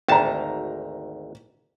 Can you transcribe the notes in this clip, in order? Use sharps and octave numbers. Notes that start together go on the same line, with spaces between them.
G#1 D2 G5 A5 A#5